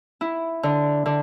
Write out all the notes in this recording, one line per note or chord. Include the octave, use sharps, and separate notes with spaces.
E4
D3
D3